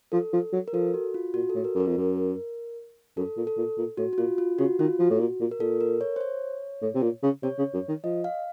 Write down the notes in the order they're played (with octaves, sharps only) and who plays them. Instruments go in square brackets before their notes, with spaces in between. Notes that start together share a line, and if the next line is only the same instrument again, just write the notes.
[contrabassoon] F3 [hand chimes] A4
[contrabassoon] F3
F#3
[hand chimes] A#4
[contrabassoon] F3 [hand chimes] A4
[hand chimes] F#4
F4
[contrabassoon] A#2 [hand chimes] F#4
[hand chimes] A4
[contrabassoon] A2
[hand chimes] A#4
[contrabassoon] F#2 [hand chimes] A#4
[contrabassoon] F2
F#2
[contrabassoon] F#2 [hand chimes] A4
[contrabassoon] A#2
[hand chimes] A4
[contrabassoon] A#2
A#2
[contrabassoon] A2 [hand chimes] F#4
[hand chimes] F#4
[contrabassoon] A#2 [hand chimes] F4
[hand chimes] F4
[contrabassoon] C#3 [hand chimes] F#4
[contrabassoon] D#3 [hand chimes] F4
[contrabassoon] F3 [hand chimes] F#4
[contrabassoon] A2
A#2
A#2
[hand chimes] A#4
[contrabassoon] A#2 [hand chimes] A4
[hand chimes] A#4
C#5
C5
C#5
[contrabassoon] A2
C3
A#2
C#3
[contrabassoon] C3 [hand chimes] C#5
[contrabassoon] C#3
F#2
D#3
[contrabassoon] F3 [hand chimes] D#5
[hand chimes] F5